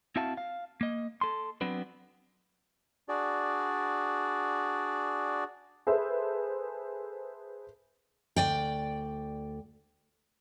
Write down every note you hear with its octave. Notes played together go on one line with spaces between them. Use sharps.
C4 E4 F#4 E5 F5 A5
F5
A#3 D#5
A4 C6
F#3 B3 C4 D4 B4
D4 F#4 G#4 D5
G#4 A4 B4 C5 E5
D2 D5 G5